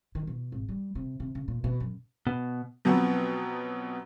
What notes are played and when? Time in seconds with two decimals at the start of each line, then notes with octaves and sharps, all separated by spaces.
0.15 D#3
0.27 B2
0.52 G#1
0.69 G3
0.95 C3
1.20 C3
1.35 C#3
1.48 A#2
1.64 B2
1.80 F#2
2.27 B2
2.85 B2 F3 F#3 B3 C4